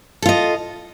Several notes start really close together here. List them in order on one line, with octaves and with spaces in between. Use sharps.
A4 F4 D#5